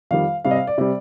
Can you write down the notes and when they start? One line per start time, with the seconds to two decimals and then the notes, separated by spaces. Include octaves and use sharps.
0.11 F2 D#3 G3 F5
0.45 C3 G3 F5
0.51 D#5
0.56 F5
0.67 D5
0.78 C3 G3 D5